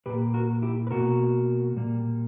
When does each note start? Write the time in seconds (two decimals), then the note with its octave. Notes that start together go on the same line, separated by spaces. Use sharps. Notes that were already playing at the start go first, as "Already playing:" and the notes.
0.06 A#2 A#3 G4 B4
0.34 F#4 A#4
0.62 E4 G4
0.87 B4
0.91 B2 A#3 F#4 A#4
1.76 A#2 G3 A#3